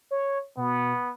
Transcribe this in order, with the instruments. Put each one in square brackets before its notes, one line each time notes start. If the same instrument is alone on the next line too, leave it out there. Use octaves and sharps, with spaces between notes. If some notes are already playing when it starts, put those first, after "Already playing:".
[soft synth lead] C#5
[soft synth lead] B2 [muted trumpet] B3